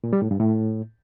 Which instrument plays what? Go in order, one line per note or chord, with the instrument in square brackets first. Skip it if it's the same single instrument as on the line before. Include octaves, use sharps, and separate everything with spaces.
[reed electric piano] A#2
G3
A2
G2
A2